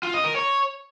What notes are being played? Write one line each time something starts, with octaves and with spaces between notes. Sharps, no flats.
F4
D#5
A#4
C#5